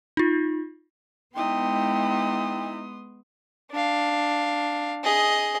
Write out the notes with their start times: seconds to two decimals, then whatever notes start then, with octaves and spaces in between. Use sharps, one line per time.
0.17 D#4 F4
1.35 G#3 B3 D#4 E4 G5 C6 D#6
3.71 D4 F5
5.04 G#4 D#5